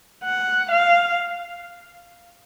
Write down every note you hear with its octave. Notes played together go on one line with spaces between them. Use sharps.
F#5
F5